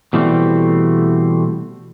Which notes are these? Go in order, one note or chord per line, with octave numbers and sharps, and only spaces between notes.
B2 E3 G3 A3 C4